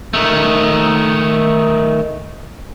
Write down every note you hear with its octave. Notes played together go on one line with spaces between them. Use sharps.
D#3 A3